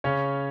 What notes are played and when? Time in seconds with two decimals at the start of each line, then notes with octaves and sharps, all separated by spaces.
0.04 C#3 C#4 C#5